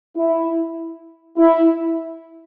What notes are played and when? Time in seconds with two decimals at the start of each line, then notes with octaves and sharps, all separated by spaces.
0.16 E4
1.37 E4